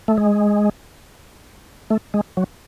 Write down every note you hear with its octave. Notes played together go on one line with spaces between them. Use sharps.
A3
G#3
A3
G#3
F#3